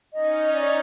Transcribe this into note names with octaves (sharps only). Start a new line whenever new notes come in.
C#4 D#4 D#5
D5